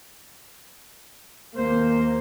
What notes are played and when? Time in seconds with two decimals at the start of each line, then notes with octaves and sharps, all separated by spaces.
1.56 D#2 A#3 C5